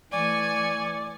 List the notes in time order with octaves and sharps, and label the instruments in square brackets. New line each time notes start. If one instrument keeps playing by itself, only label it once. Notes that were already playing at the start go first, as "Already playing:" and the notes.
[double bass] E3 A3 [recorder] D5 [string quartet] G#5 C#6 [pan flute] D6